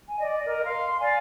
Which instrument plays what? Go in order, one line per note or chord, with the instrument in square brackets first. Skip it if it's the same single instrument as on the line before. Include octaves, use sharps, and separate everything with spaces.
[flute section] G#5
D5 D#5
A#4 D#5
F5 C6
C6
D5 F5 G#5